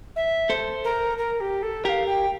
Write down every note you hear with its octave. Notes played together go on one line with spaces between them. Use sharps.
E5
A4 C5
A#4
A#4
G4
A4
G4 A#4 F5 G5
G5